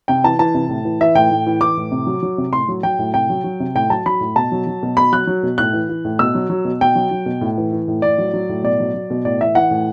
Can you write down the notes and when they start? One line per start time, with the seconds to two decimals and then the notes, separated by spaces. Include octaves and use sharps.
0.08 C3 G5
0.24 E3 A5
0.39 E3 A5
0.54 C3
0.69 A2
0.85 E3
1.01 E3 E5
1.15 A2 G5
1.31 A2
1.46 E3
1.61 E3 D6
1.77 A2
1.92 C3
2.07 F#3
2.23 F#3
2.38 C3
2.53 A2 C6
2.69 F#3
2.83 F#3 G5
2.99 A2
3.14 C3 G5
3.30 F#3
3.44 F#3
3.60 C3
3.75 A2 G5
3.90 F#3 A5
4.06 F#3 B5
4.21 A2
4.36 B2 A5
4.52 F#3
4.67 F#3
4.83 B2
4.97 B2 B5
5.12 F#3 F#6
5.27 F#3
5.43 B2
5.58 A2 F#6
5.73 E3
5.89 E3
6.05 A2
6.19 B2 E6
6.35 F#3
6.50 F#3
6.65 B2
6.81 B2 G5
6.96 F#3
7.11 F#3
7.26 B2
7.41 A2
7.57 E3
7.73 E3
7.88 A2
8.02 A2 D5
8.18 F#3
8.33 F#3
8.49 A2
8.63 B2 D5
8.80 F#3
8.94 F#3
9.10 B2
9.25 A2 D5
9.41 E3 E5
9.55 E3 F#5
9.71 A2